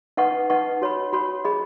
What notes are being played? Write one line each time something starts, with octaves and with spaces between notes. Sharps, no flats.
D#4 B4 D#5 F#5 C#6
D#4 B4 D#5 F#5 C#6
F#4 C#5 B5
F#4 C#5 B5
G#4 D#5 B5